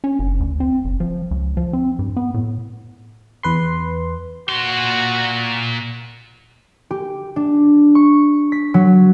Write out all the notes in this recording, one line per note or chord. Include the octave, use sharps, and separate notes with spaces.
C#4
F#1
D2
C4
F#1
F3
C#2
F3
C4
G2
B3
A2
E2 B4 C6
A#2 F#4 C6
G4
D4
C#6
B6
F#3